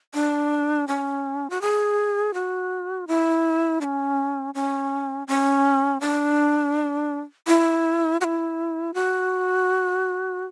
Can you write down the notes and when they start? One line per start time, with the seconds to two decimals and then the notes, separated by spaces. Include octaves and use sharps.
0.14 D4
0.88 C#4
1.50 F#4
1.61 G#4
2.34 F#4
3.08 E4
3.81 D4
3.84 C#4
4.54 C#4
5.28 C#4
6.01 D4
7.47 E4
8.21 F#4
8.24 E4
8.94 F#4